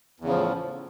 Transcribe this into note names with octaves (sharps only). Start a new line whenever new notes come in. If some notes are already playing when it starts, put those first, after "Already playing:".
E2 A2 C#3 F3